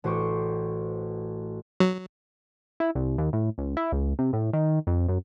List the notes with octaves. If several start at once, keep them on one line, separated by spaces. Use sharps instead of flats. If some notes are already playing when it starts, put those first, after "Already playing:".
A1 F#4 C5 C#6 D6 C#7
F#3
E4
C2
D#2
A2
C#2
E4
C#2
C3
A2
D#3
F2
F#2